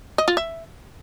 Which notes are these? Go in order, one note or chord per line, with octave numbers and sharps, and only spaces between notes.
D#5
F4
E5